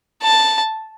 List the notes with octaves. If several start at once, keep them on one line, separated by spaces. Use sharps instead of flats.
A5